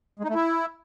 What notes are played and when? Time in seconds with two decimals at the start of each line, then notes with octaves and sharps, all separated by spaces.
0.19 G#3
0.24 D#4
0.30 A3
0.35 E4